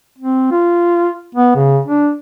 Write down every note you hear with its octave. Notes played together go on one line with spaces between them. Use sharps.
C4
F4
B3
C#3
D4